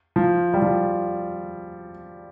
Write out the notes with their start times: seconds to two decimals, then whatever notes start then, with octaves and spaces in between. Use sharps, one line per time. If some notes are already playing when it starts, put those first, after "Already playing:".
0.16 F3
0.54 G3
0.62 F3